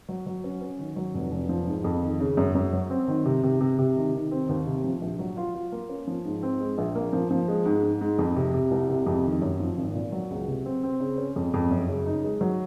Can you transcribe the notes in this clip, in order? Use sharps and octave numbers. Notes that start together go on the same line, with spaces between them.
F#3
F#3
C#4
C#4
D#3
F#3
F1
F1
F3
G#2
F2
D#3
C#3
F#2
F#2
F#3
C4
D#3
C3
C3
C3
C3
D#3
D#3
C4
D#2
C3
F3
A#1
F#3
F4
F4
A#3
C#4
F3
G#2
C4
G#3
A#1
A#3
F3
F3
G#3
G#2
G#2
G#2
F2
C3
C3
C2
C3
F2
D#3
F#2
F3
G#1
A#2
F#3
C#2
C3
C4
C4
C#3
C#4
F2
F2
F#2
C#3
D#4
G#3
F#3